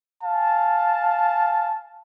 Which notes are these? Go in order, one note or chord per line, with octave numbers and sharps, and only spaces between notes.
F5 G#5 A5